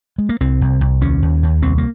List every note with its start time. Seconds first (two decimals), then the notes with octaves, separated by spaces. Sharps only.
0.18 G#3
0.29 A#3
0.41 C2 C4
0.61 C2
0.81 C2
1.01 D#2 C#4
1.22 D#2
1.43 D#2
1.62 C2 C4
1.78 A#3